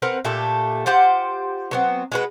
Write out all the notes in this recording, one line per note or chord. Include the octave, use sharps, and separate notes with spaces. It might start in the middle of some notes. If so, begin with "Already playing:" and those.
C4 A#4 B4 F#5
A#2 A3 G4 A4
F4 G4 C5 F#5
F#3 B3 C4
G#3 F#4 B4